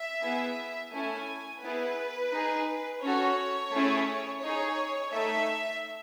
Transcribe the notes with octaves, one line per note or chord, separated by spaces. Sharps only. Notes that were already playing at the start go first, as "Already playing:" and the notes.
Already playing: E5
B3 E4 G#4
A3 C#4 E4 A4 G#5
B3 E4 G#4 B4
D#4 G#4
C#4 F#4 A4 C#5
A3 C#4 E4 G#4
D#4 G#4 C#5
A3 D#4 A4 E5